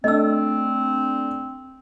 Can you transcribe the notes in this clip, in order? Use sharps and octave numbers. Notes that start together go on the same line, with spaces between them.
A3 C4 D4 D#5 E6